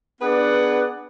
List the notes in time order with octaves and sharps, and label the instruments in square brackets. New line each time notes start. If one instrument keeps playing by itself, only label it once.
[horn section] B3 D4 G#4 B4 D5 F#5